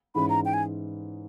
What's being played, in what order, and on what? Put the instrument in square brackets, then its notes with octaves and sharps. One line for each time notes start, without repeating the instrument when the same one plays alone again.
[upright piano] G#2 E3 G#3 C#4 E4 [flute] B5
[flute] A#5
G5
G#5